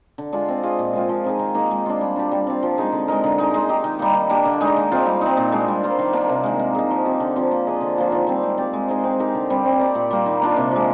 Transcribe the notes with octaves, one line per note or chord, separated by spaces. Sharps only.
D3
G#3 D4 F4
C4
F4 G#4 D#5
A#2
G#3 C4 F4
F3
C4 D#4 G#4
D#3
A#3 D#4 G#4
G#3
D4 F4
G3
D4 G4
G3
C4 F4
F3
G#3 D#4 G#4
D3
G#3 D#4 A#4
D3
G#3 D#4
G#3
D#4 G4
D#3
G3 A#3
D#3
A#3 D4 G4
D3
G#3 D#4 G#4
D#3
G#3 C4 F4
G3
C4 D#4
A#2
G#3 D4
G3
A#3 F4 C5
D#3
A#3 D4
C3
D#3 G#3
A#3
D#4 G#4
F3
C4 G4
D3
F3 C4 F4
A#3
D4 G#4 D#5
D3
F3 A#3 F4
D#3
G3 C4 G4
G#3
C4 G4 D5
G#3
D#4 G#4 C5
C4
D#4 G4 A#4
D3
G3 C4
C4
G4 A#4 D5
A#2
G3 A#3
D#3
A#3 D4 F4
C3
F3 G#3